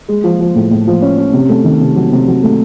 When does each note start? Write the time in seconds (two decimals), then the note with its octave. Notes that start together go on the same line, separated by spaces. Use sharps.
0.09 G#3
0.24 F3
0.40 F3
0.55 A2
0.71 A2
0.87 F3
1.02 C#4
1.18 C#4
1.33 C3
1.49 A3
1.64 D#3
1.81 C3
1.96 F#3
2.12 C3
2.28 F#3
2.43 A3